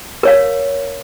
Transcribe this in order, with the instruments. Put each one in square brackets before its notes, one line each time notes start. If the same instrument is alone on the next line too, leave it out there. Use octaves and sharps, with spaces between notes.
[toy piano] A#4 C#5 F5